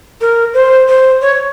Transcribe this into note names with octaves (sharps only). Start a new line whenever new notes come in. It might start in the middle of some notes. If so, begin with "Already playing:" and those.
A#4
C5
C5
C#5